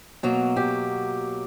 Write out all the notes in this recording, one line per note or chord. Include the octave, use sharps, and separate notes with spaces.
B2 F#3 A#3
G4